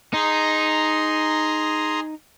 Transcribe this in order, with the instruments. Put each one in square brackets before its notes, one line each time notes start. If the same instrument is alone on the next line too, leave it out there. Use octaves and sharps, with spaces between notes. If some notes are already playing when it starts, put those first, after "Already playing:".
[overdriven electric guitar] D#4 [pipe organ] G#4 A#5 C6